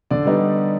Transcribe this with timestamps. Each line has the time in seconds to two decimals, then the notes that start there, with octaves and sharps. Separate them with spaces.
0.11 D3 D5
0.26 G3 B3 D#4